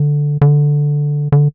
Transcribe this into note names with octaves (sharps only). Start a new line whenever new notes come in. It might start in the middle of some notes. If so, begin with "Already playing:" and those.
Already playing: D3
D3
D3